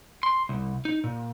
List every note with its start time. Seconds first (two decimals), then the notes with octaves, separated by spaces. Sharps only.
0.23 C6
0.49 C2
0.85 D#4
1.04 A#2